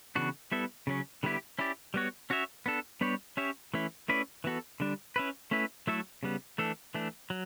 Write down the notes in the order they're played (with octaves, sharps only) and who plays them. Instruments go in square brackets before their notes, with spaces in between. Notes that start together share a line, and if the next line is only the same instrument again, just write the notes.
[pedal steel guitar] C#3 E3 B3 D4 F#4
G3 B3 E4 A4 E5
C#3 F#3 C#4
D3 G3 B3 E4 G4
C#4 E4 G4 D5
G3 B3 F#4 C#5
C#4 F#4 C#5 E5
B3 D4 A4
G3 B3 D4 G4 C#5
C#4 G4 C#5 E5
E3 A3 C#4 E4
A3 C#4 E4 B4 D5
E3 B3 F#4 A4
D3 G3 D4
C#4 E4 B4
A3 C#4 E4 B4
F#3 A3 E4 A4 E5
C#3 G3 B3
E3 A3 D4 A4
E3 A3 D4
F#3